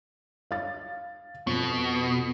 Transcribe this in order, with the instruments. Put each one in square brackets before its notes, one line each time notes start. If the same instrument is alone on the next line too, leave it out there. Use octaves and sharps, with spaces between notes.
[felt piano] F5 A6
[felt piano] F2 [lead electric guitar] B2